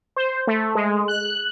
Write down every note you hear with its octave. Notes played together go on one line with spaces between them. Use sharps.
C5
A3
G#3
F#6